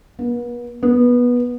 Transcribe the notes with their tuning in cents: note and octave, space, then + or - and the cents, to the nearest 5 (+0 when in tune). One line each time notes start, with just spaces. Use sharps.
B3 -40
B3 -15